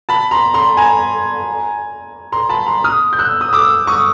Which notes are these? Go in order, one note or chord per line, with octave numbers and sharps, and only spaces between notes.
A5 B5
A#5 C6
A#5 C6
G#5 A#5
A#5 C6
A5 B5
A#5 C6
D#6 F6
G6
E6 F#6
D#6
D6 E6
C#6 D#6